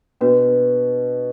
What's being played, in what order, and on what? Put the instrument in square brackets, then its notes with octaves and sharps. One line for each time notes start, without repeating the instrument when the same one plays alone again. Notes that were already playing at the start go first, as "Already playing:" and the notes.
[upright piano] B2 [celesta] D4 F#4 B4